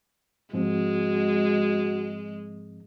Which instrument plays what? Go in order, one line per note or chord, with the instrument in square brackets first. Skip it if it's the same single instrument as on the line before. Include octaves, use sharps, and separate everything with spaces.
[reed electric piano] G#2 F3 C4 [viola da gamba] G#3 [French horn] F#4